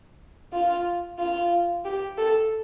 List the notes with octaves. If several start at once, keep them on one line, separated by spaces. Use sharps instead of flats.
F4
F4
G4
A4